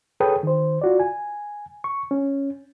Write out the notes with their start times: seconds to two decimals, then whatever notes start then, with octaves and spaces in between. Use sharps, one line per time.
0.20 G#4 A4 B4 C#5 G5 D#6
0.43 D#3 C5
0.82 F4 F#4 D5
1.00 G#5
1.84 C#6
2.11 C#4